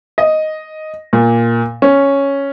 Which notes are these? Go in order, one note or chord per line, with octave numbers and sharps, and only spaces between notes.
D#5
A#2
C#4